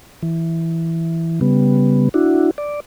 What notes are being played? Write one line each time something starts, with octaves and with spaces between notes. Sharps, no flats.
E3
C#3 G3 B3
D4 E4 F#4
D5